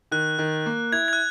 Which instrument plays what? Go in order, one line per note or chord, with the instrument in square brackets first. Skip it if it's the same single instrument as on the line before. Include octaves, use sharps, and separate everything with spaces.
[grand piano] D#3 [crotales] F#6
[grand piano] D#3
A#3
[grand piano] E4 [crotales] G#6
[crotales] G#6
F#6